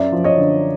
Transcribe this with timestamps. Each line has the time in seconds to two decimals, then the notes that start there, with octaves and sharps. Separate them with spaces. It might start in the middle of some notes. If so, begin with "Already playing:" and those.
Already playing: F#2 D5 E5
0.12 F3
0.24 C#5 D#5
0.37 D3